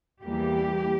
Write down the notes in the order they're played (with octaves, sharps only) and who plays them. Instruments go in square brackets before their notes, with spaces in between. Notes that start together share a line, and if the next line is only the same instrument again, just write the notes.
[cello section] E2 E3 G3 A#3 G4